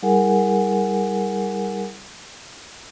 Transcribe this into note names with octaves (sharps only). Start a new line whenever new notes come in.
G3 E4 G#4 A#4 F#5 G#5